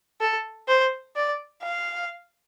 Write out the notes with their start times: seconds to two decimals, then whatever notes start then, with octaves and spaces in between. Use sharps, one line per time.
0.21 A4
0.68 C5
1.16 D5
1.63 F5